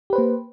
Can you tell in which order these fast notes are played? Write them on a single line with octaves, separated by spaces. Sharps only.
G4 B4 C5 A#3